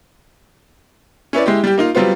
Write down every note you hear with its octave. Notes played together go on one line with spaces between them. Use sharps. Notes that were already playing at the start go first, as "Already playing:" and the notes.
C#4 E4 B4 D5
G#3 E4 G4
G3 G4
A#3 D#4 F4
F#3 G3 B3 C4 F4